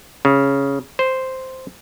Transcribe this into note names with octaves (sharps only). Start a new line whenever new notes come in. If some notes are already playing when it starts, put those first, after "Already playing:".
C#3
C5